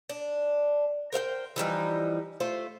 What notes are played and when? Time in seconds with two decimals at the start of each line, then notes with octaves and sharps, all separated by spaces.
0.09 D4
1.12 A#4 C5 F5 G5
1.56 E3 F3 G3 D#4
2.40 A3 F4 C5